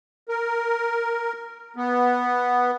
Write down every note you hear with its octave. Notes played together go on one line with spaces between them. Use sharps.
A#4
B3